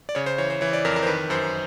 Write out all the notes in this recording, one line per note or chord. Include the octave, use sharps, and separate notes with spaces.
D5
C#3 C#5
C5
E3 C#5
C5
E3 C#5
D5
F2 A#4
A#4
C5
D#3 B4
F#2 C5